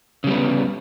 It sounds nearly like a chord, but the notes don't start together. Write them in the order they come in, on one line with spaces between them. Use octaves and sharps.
C#3 G3 B3